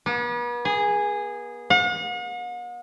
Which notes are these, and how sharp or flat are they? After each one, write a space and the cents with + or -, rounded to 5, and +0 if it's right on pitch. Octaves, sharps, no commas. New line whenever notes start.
B3 -40
G#4 -10
F#5 -45